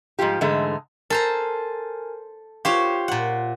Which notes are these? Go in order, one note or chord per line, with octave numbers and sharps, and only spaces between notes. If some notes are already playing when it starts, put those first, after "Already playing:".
G#2 F3 G3 F4 G4
G#2 D3 E3 G#3 A3
A4 A#4 C5 G#5 A#5
F4 G4 C5 C#5 F5
A#2 F#5